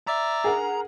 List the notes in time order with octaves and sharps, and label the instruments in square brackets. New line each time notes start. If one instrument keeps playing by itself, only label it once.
[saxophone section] D5 E5 [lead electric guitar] A#5
[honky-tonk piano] G#4 A#4 F#5